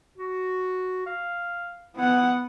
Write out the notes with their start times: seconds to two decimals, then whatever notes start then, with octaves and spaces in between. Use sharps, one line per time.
0.18 F#4
1.06 F5
1.96 B3 E4 F#5